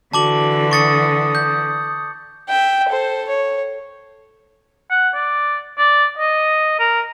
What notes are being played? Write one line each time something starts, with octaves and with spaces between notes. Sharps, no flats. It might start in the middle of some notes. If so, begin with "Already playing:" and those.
D3 E3 F#4 A5 D6 F#7
C#6 D#6 A6 C#7
G6
E5 G5
A4 C5
C#5
F#5
D5
D5
D#5
A#4